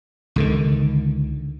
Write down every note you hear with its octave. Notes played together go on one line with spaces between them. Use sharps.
C#2 D3 D#3